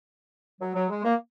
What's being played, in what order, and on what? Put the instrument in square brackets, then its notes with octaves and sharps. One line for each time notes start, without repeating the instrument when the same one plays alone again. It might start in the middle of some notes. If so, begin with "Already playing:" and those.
[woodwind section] F#3
F#3
G#3
A#3